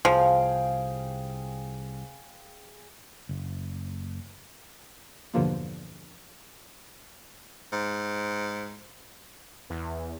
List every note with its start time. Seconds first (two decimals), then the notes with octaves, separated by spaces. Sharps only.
0.05 C2 F3 G#4 F5 G5
3.29 F#1
5.34 E2 G2 B2 D3 F3 A#3
7.73 G#2
9.70 E2